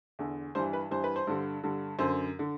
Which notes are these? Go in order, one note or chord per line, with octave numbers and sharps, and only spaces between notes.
E2 D3
G2 E3 C5
B4
G2 E3 C5
B4
C5
G2 D3
G2 D3
F#2 D3 C5
D3